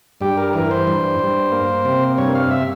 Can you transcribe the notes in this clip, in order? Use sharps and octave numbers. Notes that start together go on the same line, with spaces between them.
G2 G4
A#4
E3 A#4
C5
G2
G2
A#3
C3
G2 C#5
F5
E5